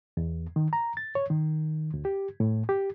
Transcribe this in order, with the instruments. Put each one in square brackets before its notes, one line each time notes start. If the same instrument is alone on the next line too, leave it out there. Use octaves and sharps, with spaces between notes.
[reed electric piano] E2
D#3
A#5
A6
C#5
D#3
D2
G4
A2
G4